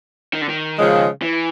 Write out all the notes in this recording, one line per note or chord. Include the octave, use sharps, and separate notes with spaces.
D#3
D3
D#3
C#3 F3 G#3
E3